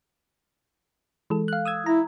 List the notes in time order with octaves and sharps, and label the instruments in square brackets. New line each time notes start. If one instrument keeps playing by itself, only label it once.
[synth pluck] E3 G#3 A4
F5 F#6
D#6 E6 G#6
[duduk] E4 [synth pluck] A#5